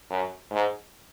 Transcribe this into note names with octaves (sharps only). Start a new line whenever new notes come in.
F#2
G#2